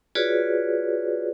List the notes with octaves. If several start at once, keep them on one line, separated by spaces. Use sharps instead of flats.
F4 F#4 G#4 B4 C#5 D5